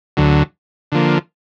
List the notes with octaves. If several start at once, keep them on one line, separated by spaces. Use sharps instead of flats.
D2 D3 F#3
D3 F3 A#3